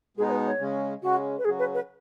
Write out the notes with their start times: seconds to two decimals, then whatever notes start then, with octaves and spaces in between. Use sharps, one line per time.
0.17 B2 G#3 B3 D#4 G#4
0.27 C#5
0.31 B4
0.45 C#5
0.60 C#3 G#3 C#4
1.02 C#3 G#3 C#4 F#4
1.38 B4
1.44 C#3 F#3 C#4 F#4 G#4
1.58 B4
1.74 B4